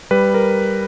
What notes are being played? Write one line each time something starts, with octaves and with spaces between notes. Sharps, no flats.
G3 B4
A#4